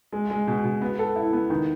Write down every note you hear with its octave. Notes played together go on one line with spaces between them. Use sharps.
G#3
G#3
B2
B2
B3
A4
E4
B3
D#3